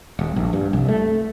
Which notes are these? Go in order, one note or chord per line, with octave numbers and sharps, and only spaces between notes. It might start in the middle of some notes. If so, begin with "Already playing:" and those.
D#1
A#1
G2
C2
A3